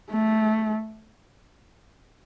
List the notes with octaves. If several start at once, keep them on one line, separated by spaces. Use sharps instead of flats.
A3